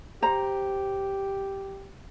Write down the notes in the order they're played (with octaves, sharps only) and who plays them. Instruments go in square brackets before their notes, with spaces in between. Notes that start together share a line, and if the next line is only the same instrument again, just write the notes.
[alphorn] G4 [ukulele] C5 A#5